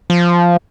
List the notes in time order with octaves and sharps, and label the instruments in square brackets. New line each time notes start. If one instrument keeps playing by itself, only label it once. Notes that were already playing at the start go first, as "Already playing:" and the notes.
[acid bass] F3